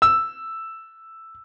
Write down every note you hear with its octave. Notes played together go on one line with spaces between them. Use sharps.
E6